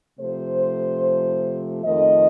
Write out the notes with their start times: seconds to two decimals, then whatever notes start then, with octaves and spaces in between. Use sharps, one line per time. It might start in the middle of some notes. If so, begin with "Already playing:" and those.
0.19 C3 F3 A3 C5
1.83 F2 D#3 A3 D#5